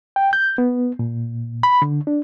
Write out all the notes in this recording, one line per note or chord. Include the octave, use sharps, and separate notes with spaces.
G5
G6
B3
A#2
B5
D3
D4